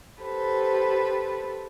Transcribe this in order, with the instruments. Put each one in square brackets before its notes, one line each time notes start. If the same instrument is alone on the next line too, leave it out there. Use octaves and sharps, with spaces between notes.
[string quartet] G4 A4 B4 C5